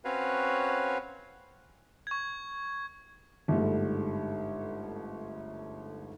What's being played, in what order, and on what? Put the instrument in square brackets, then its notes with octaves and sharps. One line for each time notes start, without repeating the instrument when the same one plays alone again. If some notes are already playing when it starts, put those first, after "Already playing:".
[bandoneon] C4 C#4 F#4 B4 C#5 F5
[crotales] C#6 G#6
[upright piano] G1 G#2 G3 A3